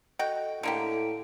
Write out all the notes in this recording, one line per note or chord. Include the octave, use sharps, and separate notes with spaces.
F#4 A4 D#5 G5
A2 D3 A#3 G4 D7